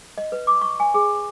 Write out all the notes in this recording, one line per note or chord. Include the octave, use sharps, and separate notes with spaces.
D#5
B4
D6
C#6
G#5
G#4